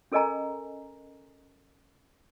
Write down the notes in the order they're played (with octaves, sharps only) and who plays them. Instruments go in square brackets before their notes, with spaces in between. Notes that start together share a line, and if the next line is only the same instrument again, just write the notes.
[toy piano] C#4 A4 A#4 D#5 G#5 A#5